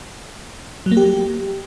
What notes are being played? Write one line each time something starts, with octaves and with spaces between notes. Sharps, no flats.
F#3
A#3
G4